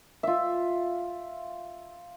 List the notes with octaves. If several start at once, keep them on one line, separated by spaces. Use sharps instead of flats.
F4 E5